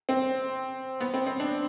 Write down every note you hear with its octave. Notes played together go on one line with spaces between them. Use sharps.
C4
B3
C4
C4
D4